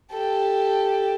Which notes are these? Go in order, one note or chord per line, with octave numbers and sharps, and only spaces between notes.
G4 A4